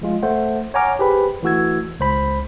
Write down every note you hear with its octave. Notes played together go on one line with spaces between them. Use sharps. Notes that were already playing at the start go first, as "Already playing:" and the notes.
F3 G#3 F4
A3 C5 F#5
C#5 F#5 G#5 A#5 D6 F6
G4 G#4 B4 C5 B5
E3 A3 F#4 E6 G#6
C#2 C5 B5